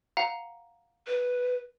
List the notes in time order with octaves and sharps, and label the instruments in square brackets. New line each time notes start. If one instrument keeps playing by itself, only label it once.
[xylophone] F5 F#5 A#5
[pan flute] B4